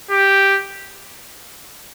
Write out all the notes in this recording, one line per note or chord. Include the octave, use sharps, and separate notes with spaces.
G4